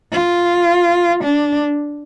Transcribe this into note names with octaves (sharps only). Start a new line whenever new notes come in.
F4
D4